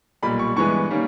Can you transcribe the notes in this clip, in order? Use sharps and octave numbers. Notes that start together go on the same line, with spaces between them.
B1 A#2 G3 B5
C#6
G2 E3 G#3 B3 C#6
D#3 G3 A#3 C#4